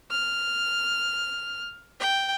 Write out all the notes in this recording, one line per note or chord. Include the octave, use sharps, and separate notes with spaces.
F6
G5